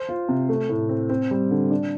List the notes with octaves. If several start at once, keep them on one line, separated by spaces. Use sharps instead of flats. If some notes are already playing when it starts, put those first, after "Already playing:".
Already playing: C5
F4
C3
A3
A2
C4
C4
G3
D3
D4